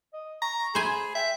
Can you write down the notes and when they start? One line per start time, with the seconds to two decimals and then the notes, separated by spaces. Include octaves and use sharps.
0.14 D#5
0.42 A#5 C#6
0.75 G#4 C5 G#5 B5
1.15 E5 G5